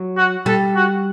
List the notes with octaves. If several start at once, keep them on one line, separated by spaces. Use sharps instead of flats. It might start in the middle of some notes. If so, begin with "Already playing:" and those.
Already playing: F#3
F#4
G3 A4
F#4